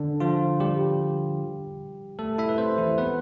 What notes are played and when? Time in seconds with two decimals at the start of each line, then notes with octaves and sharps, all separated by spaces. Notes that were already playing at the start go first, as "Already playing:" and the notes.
Already playing: D3 D4
0.20 F3 F4
0.60 G3 G4
2.19 A3 A4
2.38 E4 E5
2.49 B4
2.58 C4 C5
2.78 E3 E4
2.98 B3 B4